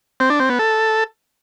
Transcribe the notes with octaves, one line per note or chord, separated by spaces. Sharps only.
C4
D4
C4
B3
A4